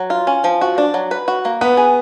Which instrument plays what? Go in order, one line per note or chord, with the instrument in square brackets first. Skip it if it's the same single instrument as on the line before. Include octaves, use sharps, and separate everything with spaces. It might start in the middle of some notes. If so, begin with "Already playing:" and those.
Already playing: [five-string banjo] F#3
F4
C#4
F3
F#4
D4
F#3
B4
F#4
A#3
[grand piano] B3 [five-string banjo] B4
[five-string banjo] G#4